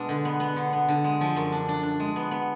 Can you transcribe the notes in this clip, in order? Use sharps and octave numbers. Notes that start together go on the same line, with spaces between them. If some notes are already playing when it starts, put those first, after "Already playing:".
Already playing: B2 G#3 D4
D3
B3
B3
D3
B3
D3
G#3
F3
F#2
D4
D4
D4
G#3
B3
B3